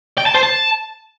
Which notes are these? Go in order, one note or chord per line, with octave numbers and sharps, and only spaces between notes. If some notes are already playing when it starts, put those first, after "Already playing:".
G5
A5
C5
A5